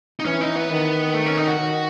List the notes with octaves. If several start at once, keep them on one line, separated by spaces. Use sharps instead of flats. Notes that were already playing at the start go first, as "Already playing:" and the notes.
D#4
E3 C#4
D#4
B3
D#3
A3
C#4
D#4
F#4
D#3